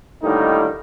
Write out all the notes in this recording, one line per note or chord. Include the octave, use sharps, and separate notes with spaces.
A2 D3 D#3 G3 A#3 D#4